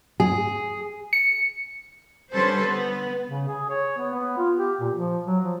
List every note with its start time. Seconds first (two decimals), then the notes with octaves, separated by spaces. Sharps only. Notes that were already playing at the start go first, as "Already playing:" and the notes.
0.20 G#4
1.13 C#7
2.32 D3 G3 C#4 A4 B4 C5
2.65 B3
3.28 C#3
3.48 G#4
3.70 C#5
3.98 B3
4.13 B3
4.38 F4
4.57 G4
4.80 A#2
4.94 F3
5.26 F#3
5.44 F3